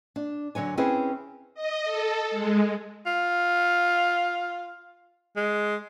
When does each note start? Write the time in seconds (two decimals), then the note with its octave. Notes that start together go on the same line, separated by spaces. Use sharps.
0.16 D4
0.55 D3 F#3 C#5 G#5
0.77 C4 C#4 E4 G#4 B4 C#5
1.55 D#5
1.84 A4
2.31 G#3
3.06 F4
5.36 G#3